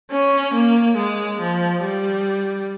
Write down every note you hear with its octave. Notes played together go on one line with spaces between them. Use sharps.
C#4
A#3
G#3
F3
G3